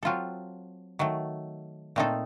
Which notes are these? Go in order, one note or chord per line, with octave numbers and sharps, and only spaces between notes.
F#3 C4 F4 A4
D#3 F#3 A3
A#2 A3 C4 D#4 A4